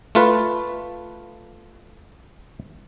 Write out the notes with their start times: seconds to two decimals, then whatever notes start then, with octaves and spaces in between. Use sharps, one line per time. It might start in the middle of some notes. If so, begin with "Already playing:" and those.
0.15 A3 F4 B4